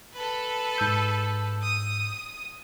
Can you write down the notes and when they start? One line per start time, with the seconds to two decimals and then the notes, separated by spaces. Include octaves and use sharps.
0.14 A4 B4
0.78 G#2 E6 G6
1.62 D#6